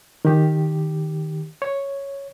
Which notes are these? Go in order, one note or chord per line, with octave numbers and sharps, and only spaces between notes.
D#3 G4
C#5